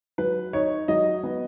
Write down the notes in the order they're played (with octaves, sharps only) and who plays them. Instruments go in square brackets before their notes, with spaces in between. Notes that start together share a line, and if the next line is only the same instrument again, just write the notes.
[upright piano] F#3 B4
D#4 C#5
F#3 D#5
B3